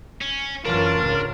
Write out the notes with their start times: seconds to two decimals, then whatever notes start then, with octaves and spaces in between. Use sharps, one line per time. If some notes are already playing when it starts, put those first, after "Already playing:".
0.21 C#4
0.65 F#2 E3 D4 F4 A#4 C#5
1.01 C#2 G#2